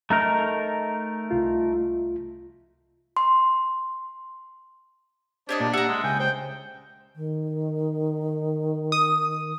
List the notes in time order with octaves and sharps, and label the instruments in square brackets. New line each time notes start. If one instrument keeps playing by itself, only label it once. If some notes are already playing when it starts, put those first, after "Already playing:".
[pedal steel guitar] A3 D#4 A#4 [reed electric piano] A#5
[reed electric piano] C2 F4
[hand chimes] C6
[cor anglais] D4 [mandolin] G4 C#5 D#5 [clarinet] C5
[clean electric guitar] A#2 [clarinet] A5
[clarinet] G4 [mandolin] E5 A#5 [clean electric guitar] F#5
[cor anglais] G#3
[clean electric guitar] C#2 [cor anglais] G5 [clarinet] G#5
[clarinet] C5 [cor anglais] G5
[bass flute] D#3
[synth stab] D#6